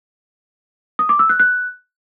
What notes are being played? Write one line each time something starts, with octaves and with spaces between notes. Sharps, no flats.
D#6
D6
E6
F#6
F#6